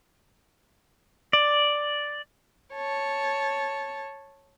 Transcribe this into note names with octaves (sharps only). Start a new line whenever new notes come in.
D5
C#5 A5